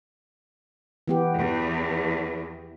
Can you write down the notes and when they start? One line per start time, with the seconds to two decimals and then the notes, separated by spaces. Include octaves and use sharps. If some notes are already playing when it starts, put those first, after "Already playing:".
1.08 E3 B3 G4
1.38 E2